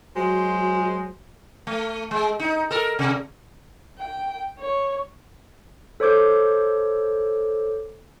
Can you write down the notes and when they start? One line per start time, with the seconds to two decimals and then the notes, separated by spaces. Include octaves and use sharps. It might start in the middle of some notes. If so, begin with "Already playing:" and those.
0.16 F#3 G#3 F#4 C5
1.67 A3
2.11 G#3
2.40 D#4
2.71 A4 A#4
2.99 C3
3.99 G5
4.60 C#5
6.00 A4 C5 C#5 D6 G6